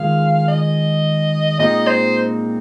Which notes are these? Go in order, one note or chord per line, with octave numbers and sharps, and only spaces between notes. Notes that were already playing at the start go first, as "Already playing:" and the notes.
Already playing: D#3 G#3 F4 G#4 F5
D#5
A#2 G#3 C4 D#4 D#5
C5